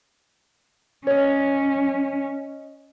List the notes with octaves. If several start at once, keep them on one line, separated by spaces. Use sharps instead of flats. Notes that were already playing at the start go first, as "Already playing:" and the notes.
C#4 C#5 D#5